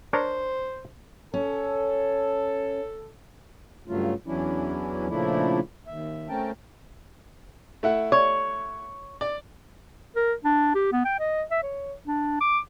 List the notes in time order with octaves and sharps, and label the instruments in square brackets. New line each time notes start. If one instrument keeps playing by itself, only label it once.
[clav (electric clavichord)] D4 A#4 C#5 [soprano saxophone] C5
[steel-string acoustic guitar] C#4 [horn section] A4
[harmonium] G2 C#3 F#3 A3 F4
E2 E3 F#3 C#4 D4 E4
A#2 C#3 F3 A3 D4 E4
D#2 E5
A3 C4 C#4 A#4 G5 A5
[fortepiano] A3 E4 F#5
[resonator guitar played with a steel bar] C#5
[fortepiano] D5
[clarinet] A#4
D4
G4
B3
G5
D#5
E5
C#5
D4
D6